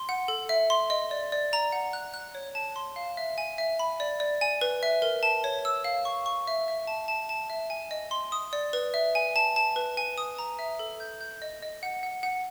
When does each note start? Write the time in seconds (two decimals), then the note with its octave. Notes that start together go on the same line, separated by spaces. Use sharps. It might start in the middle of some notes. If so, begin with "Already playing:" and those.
Already playing: C6
0.09 F#5
0.28 A4
0.49 E5
0.70 C6
0.90 D#5
1.11 D5
1.32 D5
1.53 A#5
1.72 F#5
1.93 F#6
2.14 F#6
2.35 C#5
2.55 A5
2.76 C6
2.96 F5
3.17 E5
3.38 G#5
3.58 E5
3.79 B5
4.00 D5
4.20 D5
4.41 G#5
4.61 B4
4.83 E5
5.02 A#4
5.23 A5
5.44 C#5
5.65 E6
5.84 F5
6.05 C#6
6.26 C#6
6.47 E5
6.68 E5
6.87 A5
7.08 A5
7.29 A5
7.50 E5
7.70 G#5
7.91 D#5
8.11 C6
8.32 D#6
8.53 D5
8.73 B4
8.94 E5
9.15 G#5
9.36 A5
9.56 A5
9.76 B4
9.97 G#5
10.18 D#6
10.39 A#5
10.59 E5
10.79 A4
11.00 G6
11.21 G6
11.42 D#5
11.62 D#5
11.83 F#5
12.03 F#5
12.23 F#5